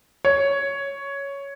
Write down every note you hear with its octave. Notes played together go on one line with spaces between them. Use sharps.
C#5